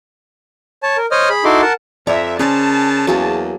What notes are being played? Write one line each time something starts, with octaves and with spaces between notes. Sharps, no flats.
C#5 A5
A#4
C5 C#5 D#5 D#6 F6
G#4 B5
D#4 E4 F#4 A4 C6 D6
A#4 F#5 A5
F2 D5 E5 A#5
C#3 C#4 A#4 C5 D5 A5
E2 F#3 A#3 G#4